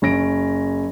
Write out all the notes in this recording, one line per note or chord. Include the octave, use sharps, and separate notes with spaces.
F#1 C#4 A#6 D7